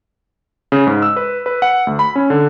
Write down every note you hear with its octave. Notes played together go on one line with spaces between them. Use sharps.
C#3
G#2
E6
B4
B4
F#5
D2
B5
C#4
D3